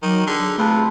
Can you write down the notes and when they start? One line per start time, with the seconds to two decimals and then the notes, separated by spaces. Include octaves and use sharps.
0.03 D#3 F#3
0.27 D3 G#4
0.58 C3 A3 E4 F4 B4 A5